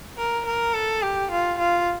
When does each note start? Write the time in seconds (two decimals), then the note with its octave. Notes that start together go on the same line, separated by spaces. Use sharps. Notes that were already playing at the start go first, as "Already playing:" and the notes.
0.17 A#4
0.46 A#4
0.74 A4
1.03 G4
1.31 F4
1.59 F4